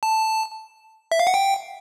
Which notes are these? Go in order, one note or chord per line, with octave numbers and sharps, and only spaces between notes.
A5
E5
F5
F#5
G5